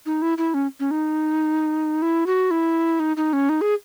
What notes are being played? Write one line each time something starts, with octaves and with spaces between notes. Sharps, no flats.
D#4
E4
E4
C#4
C#4
D#4
E4
F#4
E4
D#4
D#4
C#4
D#4
G#4